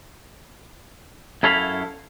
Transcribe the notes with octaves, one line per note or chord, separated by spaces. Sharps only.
F#2 E4 A4 C#5 F5 B5